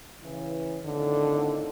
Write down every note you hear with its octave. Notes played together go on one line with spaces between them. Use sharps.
C#3 E3
F2 A2 D3 D#3